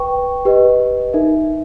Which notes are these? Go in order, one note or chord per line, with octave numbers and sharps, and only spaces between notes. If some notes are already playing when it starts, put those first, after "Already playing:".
Already playing: B4 G5 C#6
G4 B4 D#5
D#4 A#4 E5